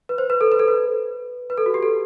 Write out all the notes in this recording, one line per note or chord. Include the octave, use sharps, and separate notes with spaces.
B4
C5
B4
A4
B4
A4
B4
B4
A4
F#4
G4
A4